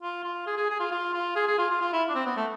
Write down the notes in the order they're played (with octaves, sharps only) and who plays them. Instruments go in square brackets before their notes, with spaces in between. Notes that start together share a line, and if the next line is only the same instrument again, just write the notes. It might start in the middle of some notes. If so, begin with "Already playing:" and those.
[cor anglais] F4
F4
G#4
G#4
G#4
F4
F4
F4
G#4
G#4
F4
F4
F4
E4
D4
C4
B3
A3